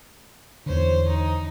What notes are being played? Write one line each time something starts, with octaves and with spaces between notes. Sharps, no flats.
E2 D3 C5 C#5
D#4